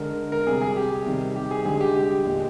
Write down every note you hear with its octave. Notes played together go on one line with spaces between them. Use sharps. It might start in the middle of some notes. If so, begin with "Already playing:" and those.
Already playing: D3 G#3 A#4
A#4
C3 G3 G#4
G#4
G4
C3 D#3 G3
G4
G#4
D3 G#3 G#4
G4
G4
A#2 G#3